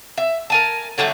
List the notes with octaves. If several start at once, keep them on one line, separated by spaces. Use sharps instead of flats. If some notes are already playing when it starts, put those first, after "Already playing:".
E5
A#4 G#5 A5
D3 F#3 G3 A3